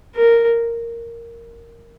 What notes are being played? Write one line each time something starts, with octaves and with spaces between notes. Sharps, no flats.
A#4